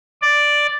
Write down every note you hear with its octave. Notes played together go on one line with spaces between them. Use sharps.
D5